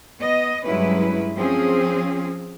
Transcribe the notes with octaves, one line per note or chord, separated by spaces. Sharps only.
B3 D#5
G2 F#3 G#3 C#4 E4 B4
F3 C4 C#4 G#4